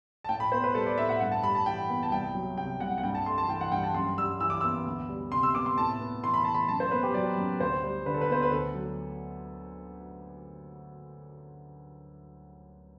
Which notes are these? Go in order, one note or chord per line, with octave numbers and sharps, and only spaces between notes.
A5
A2 G5
B5
B3 C5
B4
G3 A4
D5
A2 E5
F#5
G2 F#5
A5
G3 B5
A5
E3 G5
B3
A5
C2 G5
F#3
C3 G5
C2 F#5
F#5
G2 G5
A5
A3 C6
A5
E3 G5
F#5
G2 G5
A5
F#2 C6
G3 E6
E3 E6
D6
B3 E6
D2
G3
C3 C6
E6
B3 D6
C6
A2 A5
B3
E3 C6
B5
A2 A5
B5
F#2 A5
C5
B3 B4
G4
F#3 D5
F#2
D2 C5
G3
D3 B4
A4
B4
B3 C5
B4
D2 A4
F#3